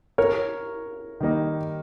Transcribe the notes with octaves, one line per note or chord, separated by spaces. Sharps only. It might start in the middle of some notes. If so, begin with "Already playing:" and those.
A#4 C#5
D#3 G3 A#3 D#4